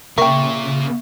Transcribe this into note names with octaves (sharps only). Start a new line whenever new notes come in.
A#2 C#3 A#4 E5 G5 C#6 A#6